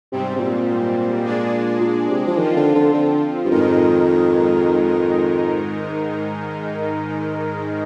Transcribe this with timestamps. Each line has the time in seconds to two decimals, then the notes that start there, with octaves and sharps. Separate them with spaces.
0.12 G#2 C3 G3 C4
0.36 C3
0.40 A#2
1.24 G#3 D4 G#4 D5
1.81 A#2
2.09 C3
2.27 F3
2.38 D#3 F3 C4 F4
2.56 D3
2.75 D3
2.94 D3
3.45 G2
3.50 F2 G#2 D#3 G#3 D#4 A#4